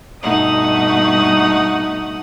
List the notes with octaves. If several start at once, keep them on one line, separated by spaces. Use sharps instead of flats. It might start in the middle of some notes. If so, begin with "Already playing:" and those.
G2 B2 A3 D#4 F#5 D#6